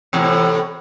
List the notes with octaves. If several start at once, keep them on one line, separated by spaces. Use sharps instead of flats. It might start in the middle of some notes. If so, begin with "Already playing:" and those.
E2 A2 C3